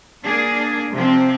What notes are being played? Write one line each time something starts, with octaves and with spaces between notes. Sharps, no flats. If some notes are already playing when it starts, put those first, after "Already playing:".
A#3 D4 G#4
C3 F3 C4